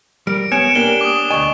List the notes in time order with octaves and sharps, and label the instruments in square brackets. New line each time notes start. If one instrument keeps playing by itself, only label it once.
[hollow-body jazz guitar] G3 [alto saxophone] A#4 [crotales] D7
[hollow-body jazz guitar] B3 [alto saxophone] C#5 [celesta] G#5 D7 [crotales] E7
[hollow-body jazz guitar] A#3 G4 [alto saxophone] D4 [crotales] G7
[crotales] D6 D#6
[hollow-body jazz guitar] D2 G#5 [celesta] D#5 C#6